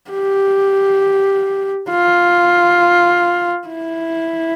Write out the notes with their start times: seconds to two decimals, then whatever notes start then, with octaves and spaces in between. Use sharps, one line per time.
0.10 G4
1.89 F4
3.68 E4